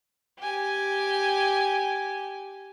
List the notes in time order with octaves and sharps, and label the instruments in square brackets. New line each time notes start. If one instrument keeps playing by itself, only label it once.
[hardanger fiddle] G4 G#5